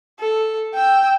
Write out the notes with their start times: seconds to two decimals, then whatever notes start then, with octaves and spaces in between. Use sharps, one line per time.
0.20 A4
0.75 G5 E6